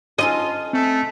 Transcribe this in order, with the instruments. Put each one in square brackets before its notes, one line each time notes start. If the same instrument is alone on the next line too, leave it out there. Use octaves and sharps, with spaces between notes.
[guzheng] C#4 D#4 A4 [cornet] F4 [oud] D#5
[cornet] A3 [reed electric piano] C4